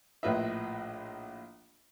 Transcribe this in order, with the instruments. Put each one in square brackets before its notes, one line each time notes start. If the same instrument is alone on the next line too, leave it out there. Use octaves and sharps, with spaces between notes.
[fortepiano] A#1 A2 F4 B4 D#5 E5